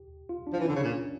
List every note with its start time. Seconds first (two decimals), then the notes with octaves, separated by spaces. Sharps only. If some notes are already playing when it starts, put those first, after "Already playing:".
Already playing: G4
0.29 F4
0.47 D4
0.53 F3
0.60 E3
0.65 D3 C#4
0.75 C#3
0.83 A#2